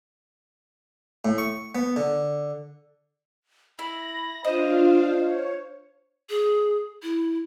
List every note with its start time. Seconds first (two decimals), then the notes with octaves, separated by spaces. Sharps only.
1.25 A2
1.38 C#6
1.75 B3
1.96 D3
3.79 E4 B5 A#6
4.44 D4 F4 C5 D#5 F5
5.21 C#5
6.30 G#4
7.03 E4